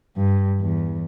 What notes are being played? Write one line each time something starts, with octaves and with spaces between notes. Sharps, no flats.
G2
E2